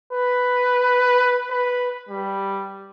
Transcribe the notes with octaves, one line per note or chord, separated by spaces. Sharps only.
B4
B4
G3